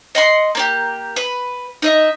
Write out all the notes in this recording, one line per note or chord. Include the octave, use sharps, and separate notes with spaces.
D#5 F#5 C6
A#3 D4 G4
B4
D#4 D#5 E5